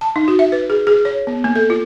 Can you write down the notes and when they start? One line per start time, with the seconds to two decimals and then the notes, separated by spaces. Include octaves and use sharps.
0.01 A5
0.16 D#4
0.28 F#4
0.39 E5
0.52 B4
0.70 G#4
0.87 G#4
1.05 C#5
1.27 B3
1.44 A#3
1.56 A4
1.70 F4